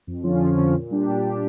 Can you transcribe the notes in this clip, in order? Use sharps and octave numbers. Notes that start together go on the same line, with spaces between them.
F2
D3 F3 C#4 F4
F2
D3 F3 C#4 F4
A#2
G3 D4 G4
A#2
G3 D4 G4